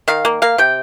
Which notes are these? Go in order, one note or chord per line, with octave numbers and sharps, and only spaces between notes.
D#3 F5
A#3
A#3 F5
C3 G5